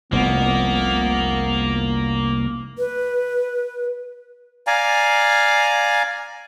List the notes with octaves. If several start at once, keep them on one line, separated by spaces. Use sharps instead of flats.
F1 C2 F3 A#3 B3
B4
D5 F5 G#5 A#5